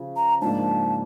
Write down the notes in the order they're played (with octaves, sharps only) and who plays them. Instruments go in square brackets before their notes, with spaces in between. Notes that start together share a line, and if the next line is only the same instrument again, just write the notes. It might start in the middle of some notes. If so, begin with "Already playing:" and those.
Already playing: [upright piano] C#3 F3
[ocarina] A#5
[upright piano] G#2 F3 A#3 D4 [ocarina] A5